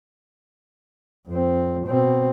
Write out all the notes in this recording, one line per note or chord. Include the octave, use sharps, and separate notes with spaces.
F2 C4
B2 C4